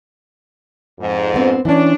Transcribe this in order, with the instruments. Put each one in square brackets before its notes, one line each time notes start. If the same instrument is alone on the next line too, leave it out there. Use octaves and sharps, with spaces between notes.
[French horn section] F2 G#2
[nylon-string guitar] B3 C4 D4
[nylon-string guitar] E3 C#4 [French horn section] D4